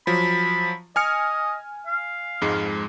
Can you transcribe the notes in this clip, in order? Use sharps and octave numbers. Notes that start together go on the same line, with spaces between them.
F3 F#3 B5
D#5 G#5 F6 C#7
F5
F2 G#2 G#3